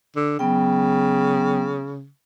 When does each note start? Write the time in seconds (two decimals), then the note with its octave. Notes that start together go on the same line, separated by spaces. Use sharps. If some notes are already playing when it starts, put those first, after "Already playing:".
0.16 D3
0.39 C#3 F#3 B3 G5